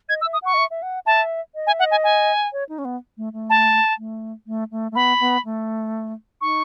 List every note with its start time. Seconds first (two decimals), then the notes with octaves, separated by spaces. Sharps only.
0.09 D#5 G#6
0.21 E6
0.25 E5
0.33 D#6
0.42 F#5 C#6
0.54 D#5
0.58 E5
0.70 E5
0.82 F#5
1.06 E5 A5
1.55 D#5
1.67 G#5
1.69 E5
1.79 F#5
1.83 D#5
1.91 G#5
2.04 G#5
2.52 C#5
2.69 D#4
2.78 C#4
2.85 B3
3.17 A3
3.33 A3
3.50 A5
3.98 A3
4.47 A3
4.71 A3
4.92 A3
4.95 B3 B5
5.20 B3
5.45 A3
6.41 D#4 C#6